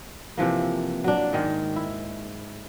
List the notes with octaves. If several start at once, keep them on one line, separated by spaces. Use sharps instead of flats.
C3 E3 F3 A#3
F#3 D4
G#2 D#3 G#3
E4